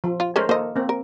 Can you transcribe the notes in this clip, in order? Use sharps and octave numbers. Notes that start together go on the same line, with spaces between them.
F3
F4
G#3 A3 C#4 A#4 C5
A#3 A4 C5 D#5
A#3 C4
A#4